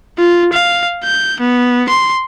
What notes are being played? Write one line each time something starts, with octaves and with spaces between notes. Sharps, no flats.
F4
F5
G6
B3
C6